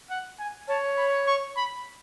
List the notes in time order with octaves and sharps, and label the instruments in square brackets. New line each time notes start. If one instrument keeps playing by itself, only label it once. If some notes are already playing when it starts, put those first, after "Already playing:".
[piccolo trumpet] F#5
G#5
[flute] C#5 [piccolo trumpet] A5
[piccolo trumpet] B5
C#6
B5